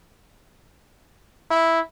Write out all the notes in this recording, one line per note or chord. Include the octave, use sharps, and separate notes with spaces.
E4